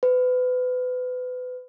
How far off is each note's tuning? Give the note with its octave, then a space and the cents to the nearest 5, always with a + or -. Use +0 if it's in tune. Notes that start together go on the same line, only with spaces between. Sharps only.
B4 +30